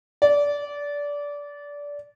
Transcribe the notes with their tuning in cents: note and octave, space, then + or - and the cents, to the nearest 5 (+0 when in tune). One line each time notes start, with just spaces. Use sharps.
D5 -20